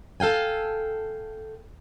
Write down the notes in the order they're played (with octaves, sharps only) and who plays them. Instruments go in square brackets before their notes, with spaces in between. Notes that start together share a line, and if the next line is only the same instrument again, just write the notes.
[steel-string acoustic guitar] A4 F5 G5 G#5